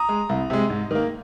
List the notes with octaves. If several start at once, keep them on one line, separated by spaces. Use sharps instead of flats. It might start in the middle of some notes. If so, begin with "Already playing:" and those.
Already playing: A#5 D#6
G#3
C2
C3 G#3
G#2
D#3 A#3